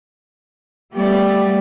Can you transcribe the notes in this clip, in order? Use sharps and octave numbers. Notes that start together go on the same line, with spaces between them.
G3 A3 B3 G4 D5